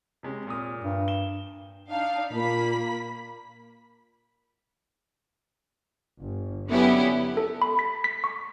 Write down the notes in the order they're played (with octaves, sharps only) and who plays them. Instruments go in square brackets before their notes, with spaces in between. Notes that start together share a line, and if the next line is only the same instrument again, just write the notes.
[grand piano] C3 G#3 C#4
A#2 A#4 D#6
[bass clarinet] G2
[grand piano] E7 G7
[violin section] D4 D#4 F5
[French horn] A#2 [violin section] A#3 B5 B6
[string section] G1
D3 F#3 B3 C#4 E4 G4
[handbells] A4
B5
B6
B6
C#6